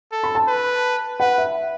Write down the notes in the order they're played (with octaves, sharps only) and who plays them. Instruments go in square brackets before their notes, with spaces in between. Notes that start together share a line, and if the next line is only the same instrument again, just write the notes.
[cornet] A4
[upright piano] B5
A5
[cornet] B4
[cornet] B4 [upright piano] F#5
[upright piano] E5